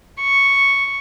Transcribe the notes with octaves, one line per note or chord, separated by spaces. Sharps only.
C#6